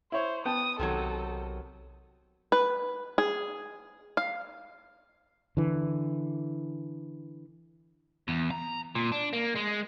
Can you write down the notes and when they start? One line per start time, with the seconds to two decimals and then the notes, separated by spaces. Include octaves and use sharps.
0.12 E4 C5 C#5
0.45 B3 G5 A5 D#6
0.80 B1 C3 D#3 F#3 A4
2.52 B4
3.18 G#4
4.17 F5
5.57 D3 E3
8.28 E2
8.51 A#5
8.95 A#2
9.12 D4
9.33 A#3
9.56 G#3